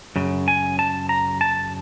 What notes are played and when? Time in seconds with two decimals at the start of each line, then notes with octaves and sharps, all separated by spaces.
0.16 F#2 C#3
0.48 G#5
0.79 A5
1.09 A#5
1.41 A5